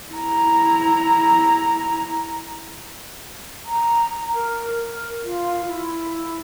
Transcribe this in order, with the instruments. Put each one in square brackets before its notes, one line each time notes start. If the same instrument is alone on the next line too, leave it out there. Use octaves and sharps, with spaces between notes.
[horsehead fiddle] E4 A#5
[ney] A#5
A#4
A#4
F4
E4